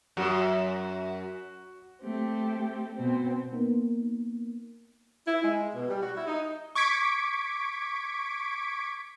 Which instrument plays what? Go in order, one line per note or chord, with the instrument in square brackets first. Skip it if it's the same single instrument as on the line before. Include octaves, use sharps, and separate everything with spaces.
[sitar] F#2 [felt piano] F#4
[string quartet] A3 C4 G4
B2 C4
[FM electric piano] A#3 B3 D#4 A#4
[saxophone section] E4
G#3
B2
G3
F#4
E4
D#4
[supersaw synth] C#6 D6 G#6 B6 D7